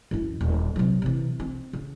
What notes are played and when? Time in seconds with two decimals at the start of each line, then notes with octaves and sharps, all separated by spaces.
0.11 F#2 E4
0.41 D#1
0.76 C3 F#3
1.02 C3 E3
1.40 C4
1.73 C#3